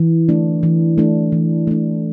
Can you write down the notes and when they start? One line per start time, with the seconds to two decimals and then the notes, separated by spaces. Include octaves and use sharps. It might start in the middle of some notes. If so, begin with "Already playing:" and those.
Already playing: E3
0.29 A3 D4
0.63 E3
0.98 A3 D4
1.32 E3
1.67 A3 D4